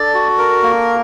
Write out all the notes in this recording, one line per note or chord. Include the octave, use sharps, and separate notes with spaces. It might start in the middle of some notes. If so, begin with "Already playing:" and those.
Already playing: D4 A4 D5
F#4
A#4
A#3